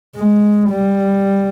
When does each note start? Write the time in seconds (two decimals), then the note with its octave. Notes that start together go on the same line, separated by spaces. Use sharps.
0.16 G#3
0.69 G3